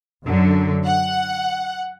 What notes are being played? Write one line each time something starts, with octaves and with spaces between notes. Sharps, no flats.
F#2 D3 F#3
F#5